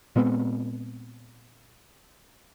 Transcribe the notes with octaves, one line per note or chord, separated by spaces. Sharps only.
A#2 G#3 B3 C4